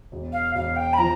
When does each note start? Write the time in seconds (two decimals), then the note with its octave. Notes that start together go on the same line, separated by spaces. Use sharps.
0.12 E1
0.33 F5
0.55 E1 F5
0.76 G5
0.93 B5
0.98 F3 A#5